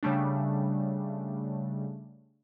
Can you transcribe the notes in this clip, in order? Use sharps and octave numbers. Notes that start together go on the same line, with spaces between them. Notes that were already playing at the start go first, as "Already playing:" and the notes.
C#3 G3 A3 D4